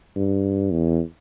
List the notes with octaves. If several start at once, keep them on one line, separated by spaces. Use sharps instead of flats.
G2
E2